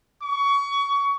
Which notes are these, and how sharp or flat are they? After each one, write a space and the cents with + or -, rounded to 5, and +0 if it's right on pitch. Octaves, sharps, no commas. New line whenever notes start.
C#6 +25